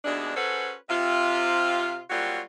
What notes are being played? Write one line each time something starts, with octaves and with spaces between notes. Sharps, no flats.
D#2 B2 E3 G#3 D4
C#4 F#4 G#4 A4 B4 C5
C3 F4
F#3 G3 A#3 C4 F4 F#4